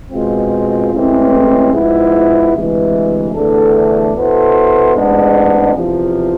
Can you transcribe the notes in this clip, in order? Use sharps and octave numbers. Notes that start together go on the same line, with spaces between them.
B2 G#3 C4 F4
A1 A2 E3 G#3 C4
G#2 F3 B3 E4
D2 C3 E3 G#3
E2 D3 A3 D4 A4
B2 B3 E4 A4 C5
A1 G#2 G#3 B3 D4
E2 C3 F3